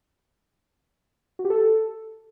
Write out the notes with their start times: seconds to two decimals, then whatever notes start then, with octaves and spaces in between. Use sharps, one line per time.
1.39 F#4
1.45 G4
1.50 A4